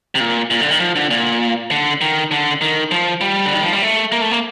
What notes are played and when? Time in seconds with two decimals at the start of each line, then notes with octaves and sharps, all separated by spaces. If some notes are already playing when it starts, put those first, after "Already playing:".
0.15 C3
0.20 A#2
0.51 A#2
0.61 D3
0.71 D#3
0.80 F3
0.96 D3
1.10 A#2
1.71 D3
2.01 D#3
2.31 D3
2.61 D#3
2.91 F3
3.21 G3
3.46 D3
3.55 D#3
3.63 F3
3.73 G3
3.82 A3
4.12 A#3
4.21 A3
4.31 A#3